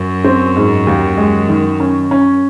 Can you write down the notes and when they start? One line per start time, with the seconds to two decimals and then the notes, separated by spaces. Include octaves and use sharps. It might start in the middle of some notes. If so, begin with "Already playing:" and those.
Already playing: F#2
0.24 C4
0.56 G#2
0.87 D#2
1.17 G#3
1.49 D#3
1.80 C#4
2.11 C#4